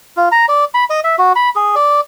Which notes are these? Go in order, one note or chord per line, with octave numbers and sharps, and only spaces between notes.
F4
A#5
D5
B5
D#5
E5
F#4
B5
G#4
D5